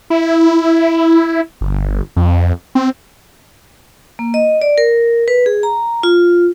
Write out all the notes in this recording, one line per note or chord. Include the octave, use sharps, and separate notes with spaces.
E4
G1
F2
C4
A#3
D#5
D5
A#4
B4
G#4
A#5
F4